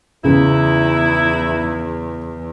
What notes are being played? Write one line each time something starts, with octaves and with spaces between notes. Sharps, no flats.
E2 C#3 D#4 E4